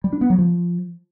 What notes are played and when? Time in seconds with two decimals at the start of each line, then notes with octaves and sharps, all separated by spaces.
0.04 G3
0.13 D4
0.21 B3
0.30 F#3
0.38 F3